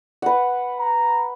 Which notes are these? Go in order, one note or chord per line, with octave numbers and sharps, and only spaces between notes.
B4 F#5
A#5